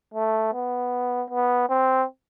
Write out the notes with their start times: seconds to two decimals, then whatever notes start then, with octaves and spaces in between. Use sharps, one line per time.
0.14 A3
0.53 B3
1.30 B3
1.69 C4